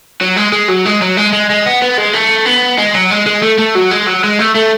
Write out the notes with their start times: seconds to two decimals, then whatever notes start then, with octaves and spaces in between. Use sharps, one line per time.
0.21 F#3
0.37 G#3
0.53 G#3
0.69 F#3
0.85 G#3
1.02 F#3
1.17 G#3
1.33 G#3
1.50 G#3
1.66 B3
1.82 B3
1.98 G#3
2.14 A3
2.46 B3
2.78 G#3
2.94 F#3
3.11 G#3
3.27 G#3
3.42 A3
3.58 A3
3.75 F#3
3.91 G#3
4.06 F#3
4.24 G#3
4.39 A3
4.55 A3